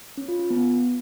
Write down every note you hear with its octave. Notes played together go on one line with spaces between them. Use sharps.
C#4
F4
F4
B3